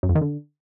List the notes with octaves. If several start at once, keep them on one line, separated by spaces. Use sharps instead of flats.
F#2
F2
D#3
D3